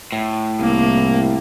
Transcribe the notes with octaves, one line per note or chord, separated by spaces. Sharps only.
A2
C2 A#3